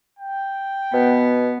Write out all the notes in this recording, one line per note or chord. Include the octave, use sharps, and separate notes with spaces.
G5
B2 B3